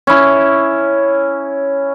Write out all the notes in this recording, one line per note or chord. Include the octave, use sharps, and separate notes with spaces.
C#4 E4